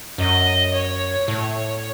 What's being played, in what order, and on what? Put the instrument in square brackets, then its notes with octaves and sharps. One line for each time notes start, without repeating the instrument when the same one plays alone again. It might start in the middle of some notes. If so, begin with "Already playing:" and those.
[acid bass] F#2 [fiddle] D#5
[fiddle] C#5
[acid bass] A2 [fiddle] C#5